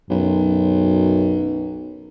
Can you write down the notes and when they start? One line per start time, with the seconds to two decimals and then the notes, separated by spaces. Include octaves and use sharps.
0.10 B1 F#2